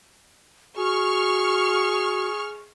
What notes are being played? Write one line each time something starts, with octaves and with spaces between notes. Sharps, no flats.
F#4 G#4 C#6 F6